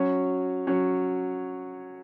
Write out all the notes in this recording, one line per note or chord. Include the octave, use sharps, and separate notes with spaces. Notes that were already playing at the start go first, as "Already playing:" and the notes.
Already playing: F#3 C#4 F#4 C#5
F#3 C#4 F#4 C#5